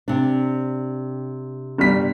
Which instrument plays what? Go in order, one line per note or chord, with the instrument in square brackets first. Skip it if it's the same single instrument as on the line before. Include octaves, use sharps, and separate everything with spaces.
[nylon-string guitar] C3 D4
[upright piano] G1 G3 B6